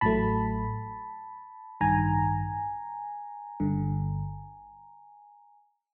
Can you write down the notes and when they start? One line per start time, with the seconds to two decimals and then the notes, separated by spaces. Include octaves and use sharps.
0.01 A1 A2 F#3 A3 A5 B5
1.80 A1 G2 D#3 G#5 A#5
3.60 G1 G2 D3